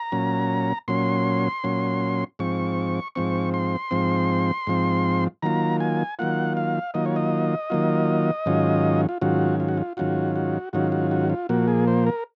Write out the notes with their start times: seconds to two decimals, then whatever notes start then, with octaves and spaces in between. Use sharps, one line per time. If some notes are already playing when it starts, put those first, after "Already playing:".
Already playing: A#5
0.12 A#2 F#3 C#4
0.88 A#2 F#3 C#4 C6
1.64 A#2 F#3 C#4
2.39 G#2 F3 C4 C#6
3.15 G#2 F3 C4 C#6
3.54 C6
3.91 G#2 F3 C4
4.67 G#2 F3 C4
5.42 D#3 F#3 A#3 F4 A#5
5.80 G#5
6.19 D#3 F#3 A#3 F4 F#5
6.57 F5
6.94 D#3 F#3 A#3 F4 D#5
7.06 C#5
7.16 D#5
7.70 D#3 F#3 A#3 F4
8.46 G#2 D#3 F#3 C#4 F4
9.09 F4
9.21 G#2 D#3 F#3 C#4 F4 F#4
9.60 F4
9.68 F#4
9.77 F4
9.97 G#2 D#3 F#3 C#4 F4 F#4
10.36 F#4
10.73 G#2 D#3 F#3 C#4 F4 F#4
10.92 F#4
11.11 F#4
11.30 F4
11.49 A#2 F3 A#3 F#4
11.68 G#4
11.88 C5
12.07 A#4